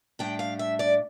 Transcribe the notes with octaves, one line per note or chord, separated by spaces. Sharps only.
A2 G3 D4 G5
F5
E5
D5